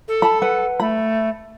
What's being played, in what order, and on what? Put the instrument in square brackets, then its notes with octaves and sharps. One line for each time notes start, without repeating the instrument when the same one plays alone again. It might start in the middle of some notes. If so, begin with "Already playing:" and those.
[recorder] A4
[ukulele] A5 B5
B4 F#5
[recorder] A3 [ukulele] B5